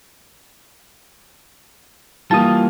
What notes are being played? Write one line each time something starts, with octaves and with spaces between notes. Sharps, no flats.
E3 G3 A#3 F4 A5 D#6